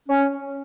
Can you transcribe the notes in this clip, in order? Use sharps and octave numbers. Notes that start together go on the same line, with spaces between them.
C#4